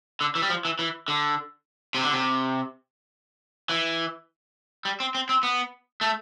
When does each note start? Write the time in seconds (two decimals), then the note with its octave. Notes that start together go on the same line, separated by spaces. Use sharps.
0.21 D3
0.35 E3
0.42 G3
0.49 F3
0.65 E3
0.79 E3
1.08 D3
1.95 C3
2.04 D3
2.13 C3
3.69 E3
4.85 G3
5.00 C4
5.15 C4
5.29 C4
5.43 B3
6.01 A3